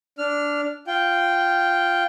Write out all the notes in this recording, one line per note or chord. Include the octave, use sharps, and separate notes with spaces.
D4 F6
F4 G5